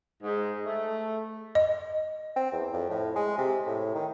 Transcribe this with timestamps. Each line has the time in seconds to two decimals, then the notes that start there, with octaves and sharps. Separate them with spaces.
0.23 G#2
0.66 A3
1.55 D#5
2.36 C4
2.52 E2
2.73 F2
2.90 A2
3.16 G#3
3.38 C3
3.66 A2
3.95 D#3